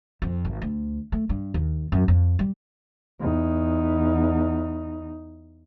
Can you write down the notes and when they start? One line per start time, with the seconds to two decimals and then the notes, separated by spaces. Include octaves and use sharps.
0.22 F2
0.45 G#1
0.62 D2
1.12 A3
1.29 G2
1.54 D#2
1.92 F#2
2.08 F2
2.39 G3
3.20 E2 D#4